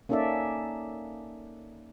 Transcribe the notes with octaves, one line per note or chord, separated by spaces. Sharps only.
A#3 C#4 D#4 A4 D5 E5